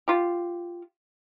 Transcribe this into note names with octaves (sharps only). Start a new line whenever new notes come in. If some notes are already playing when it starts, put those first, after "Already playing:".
F4 G4